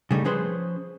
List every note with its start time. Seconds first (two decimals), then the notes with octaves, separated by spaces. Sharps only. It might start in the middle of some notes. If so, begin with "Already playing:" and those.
0.11 C#3 G3 A3 D#4
0.24 F3 C#4 G#4 B4 C5 C6